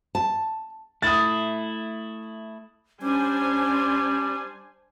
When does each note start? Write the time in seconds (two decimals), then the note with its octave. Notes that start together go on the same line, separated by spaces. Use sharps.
0.15 A5
1.02 A3 E4 D#6 A6
3.02 G3 C#4 D4 C5 G#5